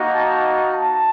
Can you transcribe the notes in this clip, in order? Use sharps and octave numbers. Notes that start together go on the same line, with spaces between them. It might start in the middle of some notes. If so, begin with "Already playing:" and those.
Already playing: A#3 D#4 F#4
A5
A5